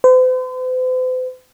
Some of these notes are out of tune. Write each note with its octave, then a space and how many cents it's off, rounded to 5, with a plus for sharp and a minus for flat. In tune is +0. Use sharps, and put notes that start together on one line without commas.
C5 -45